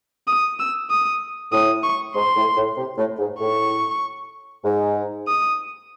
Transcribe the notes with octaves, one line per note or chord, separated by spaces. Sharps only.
D#6
E6
D#6
A2 D#6
C#6
G#2 C6
A2
A2
C3
A2
G#2
A2 C#6
G#2
D#6